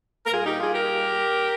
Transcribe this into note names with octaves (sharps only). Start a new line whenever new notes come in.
A#4
A#2 G3 A#3 F4 G#4
D#4 G4
F4 G#4
G4 A#4